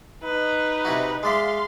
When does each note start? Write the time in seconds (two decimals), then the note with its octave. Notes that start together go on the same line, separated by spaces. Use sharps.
0.23 D#4 B4
0.85 C3 E4 F#4
1.23 G#3 D5 E5 F5 C6